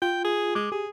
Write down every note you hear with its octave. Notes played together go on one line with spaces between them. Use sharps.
F4 G5
G#4
G#3 D6
G4 G#4